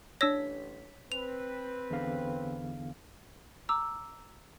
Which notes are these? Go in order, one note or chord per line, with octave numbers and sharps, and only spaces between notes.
A1 D4 C#5 E6 A#6 B6
C4 B4 F7
E2 D3 F5
A#5 D6 E6